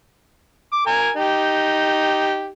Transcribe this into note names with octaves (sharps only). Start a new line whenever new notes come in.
D6
A#4 G#5 A#5
D#4 G4